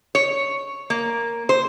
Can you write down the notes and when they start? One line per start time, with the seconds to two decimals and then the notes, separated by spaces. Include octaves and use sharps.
0.15 C#5
0.90 A#3
1.49 C5